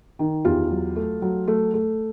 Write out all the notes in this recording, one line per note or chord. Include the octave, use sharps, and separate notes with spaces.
D#3
E2 F4 G4
F#3
A3
F#3
A3
A3